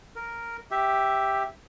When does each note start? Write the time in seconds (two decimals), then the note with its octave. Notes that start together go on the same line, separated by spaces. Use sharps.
0.16 A#4
0.71 G4 E5